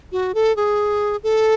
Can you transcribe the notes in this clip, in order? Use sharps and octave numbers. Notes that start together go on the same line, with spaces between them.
F#4
A4
G#4
A4